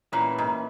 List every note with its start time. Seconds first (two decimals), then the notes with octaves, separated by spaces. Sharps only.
0.12 A#2 E3 A#3 C#4 E4 B4
0.38 G#2